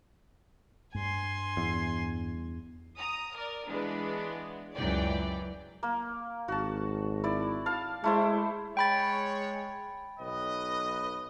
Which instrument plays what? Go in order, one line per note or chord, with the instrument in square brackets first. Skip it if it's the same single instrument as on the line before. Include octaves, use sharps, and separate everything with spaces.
[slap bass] G2 [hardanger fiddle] G#5 C6
[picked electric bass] E2
[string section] A#5 D#6
A#4 D5
E3 G#3 B3 D4
C#2 F#2 E3 F#3 D5 G5
[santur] A#3
[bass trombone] G#1 [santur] F#4 A5
[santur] E4 D5
F5 A5
[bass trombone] G#3 [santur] A3 E4 C5
[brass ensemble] G#3 C#5 [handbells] G5 B5 A6
[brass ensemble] B1 B4 D#5